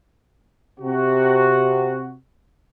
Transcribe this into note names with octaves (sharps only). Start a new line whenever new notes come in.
C3 F#4